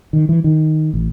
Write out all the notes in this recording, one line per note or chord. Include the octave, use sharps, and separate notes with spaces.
D#3
E3
D#3
A1